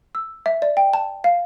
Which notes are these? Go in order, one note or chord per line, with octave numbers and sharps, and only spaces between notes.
E6
E5
D5
G5
A5
F5